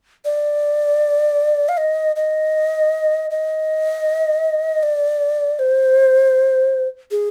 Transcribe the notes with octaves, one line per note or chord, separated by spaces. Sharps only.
D5
F5
D#5
D#5
D#5
D5
C5
G#4